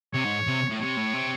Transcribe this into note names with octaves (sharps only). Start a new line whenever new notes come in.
C3 C#5
G#2
C3
A2
C3 C#5
A2
C3